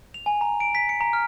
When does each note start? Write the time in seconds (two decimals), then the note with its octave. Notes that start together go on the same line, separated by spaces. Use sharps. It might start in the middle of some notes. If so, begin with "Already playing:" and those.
0.14 F7
0.26 G#5
0.41 A#5
0.60 D7
0.75 B6
0.89 C#7
1.01 A#5
1.13 F6